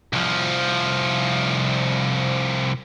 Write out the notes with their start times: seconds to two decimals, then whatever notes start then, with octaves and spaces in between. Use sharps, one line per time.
0.13 C2 F3